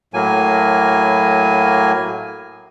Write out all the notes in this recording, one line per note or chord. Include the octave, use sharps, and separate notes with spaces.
A2 F#3 A#3 G#5